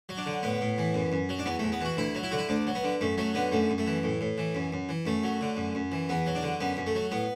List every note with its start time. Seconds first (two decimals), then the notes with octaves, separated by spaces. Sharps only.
0.09 F#3
0.17 D4
0.26 D3
0.43 A2 B3
0.61 A2
0.78 E3
0.94 F#2
1.12 F#2
1.29 F#3
1.39 D4
1.46 E2 B3
1.59 A3
1.63 E2
1.72 B3
1.81 E3 F#4
1.97 D2 E4
2.15 F#3
2.23 E4
2.31 D3 F#4
2.38 E4
2.49 D2 D4
2.67 F#3
2.75 B3
2.84 D3
3.01 F#2 A3
3.18 F#3 A3
3.34 D3 B3
3.51 F#2 A3
3.70 F#2
3.78 A3
3.87 E3
4.03 A2
4.21 A2
4.38 E3
4.55 F#2
4.72 F#2
4.89 E3
5.06 F#2 A3
5.23 F#3
5.41 D3
5.57 F#2
5.75 F#2
5.92 E3
6.09 E2 B3
6.26 F#3
6.35 D4
6.43 D3
6.60 F#2 B3
6.77 F#2
6.87 A3
6.95 F#3
7.11 A2 B3